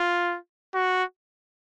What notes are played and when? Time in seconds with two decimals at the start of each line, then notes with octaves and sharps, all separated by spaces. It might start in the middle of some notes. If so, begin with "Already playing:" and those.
Already playing: F4
0.75 F#4